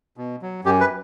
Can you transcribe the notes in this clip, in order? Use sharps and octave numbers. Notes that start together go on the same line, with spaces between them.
B2
F#3
F#2 G4
B4